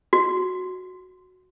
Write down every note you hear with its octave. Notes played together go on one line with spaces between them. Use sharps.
F#4